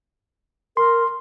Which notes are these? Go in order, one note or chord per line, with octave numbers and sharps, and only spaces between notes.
A#4 C6